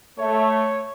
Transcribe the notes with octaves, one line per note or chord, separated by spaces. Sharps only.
A3 C#5